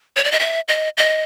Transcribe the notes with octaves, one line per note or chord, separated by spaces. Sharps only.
C#5
D5
D#5
E5
D#5
D#5